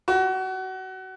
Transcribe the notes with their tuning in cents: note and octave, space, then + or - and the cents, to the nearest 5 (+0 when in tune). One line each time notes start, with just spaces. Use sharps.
F#4 +25